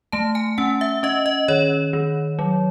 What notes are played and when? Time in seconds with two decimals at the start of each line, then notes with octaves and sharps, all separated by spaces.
0.12 A3 A5
0.35 G#5
0.58 C#4 F#5
0.81 E5
1.03 C#4 D#5
1.26 D#5
1.48 D#3 C#5
1.93 D#3
2.39 F#3